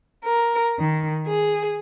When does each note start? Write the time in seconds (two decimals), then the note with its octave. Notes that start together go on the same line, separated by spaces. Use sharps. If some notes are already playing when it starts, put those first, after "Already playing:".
0.25 A#4
0.78 D#3
1.27 G#4